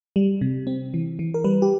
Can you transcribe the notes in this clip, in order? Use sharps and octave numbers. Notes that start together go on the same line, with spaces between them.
G3
C3
C4
E3
E3
A#4
G3 B4
G4